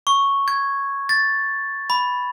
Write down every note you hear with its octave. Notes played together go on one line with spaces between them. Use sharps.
C#6
G#6
A6
B5